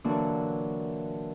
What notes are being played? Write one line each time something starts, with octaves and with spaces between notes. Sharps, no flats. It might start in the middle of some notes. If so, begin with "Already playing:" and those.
A#2 D3 E3 F#3 A#3 D4